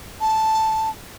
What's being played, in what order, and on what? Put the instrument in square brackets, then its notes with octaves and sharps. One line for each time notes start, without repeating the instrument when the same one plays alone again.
[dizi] A5